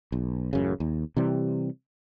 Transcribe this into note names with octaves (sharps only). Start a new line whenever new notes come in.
B1
A1 F#2 C#3
D#2
C3 E3 G3